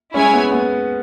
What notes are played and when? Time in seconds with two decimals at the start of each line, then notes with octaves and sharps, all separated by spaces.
0.14 G#3 C#4 E4 C#5 G#5
0.34 B3
0.52 B3